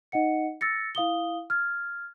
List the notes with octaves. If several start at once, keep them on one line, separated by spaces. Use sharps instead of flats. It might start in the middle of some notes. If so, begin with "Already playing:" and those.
D#4 D#5 F#5 C#7
E6 A6 A#6 C#7
E4 F5 D#6 G7
F6 G#6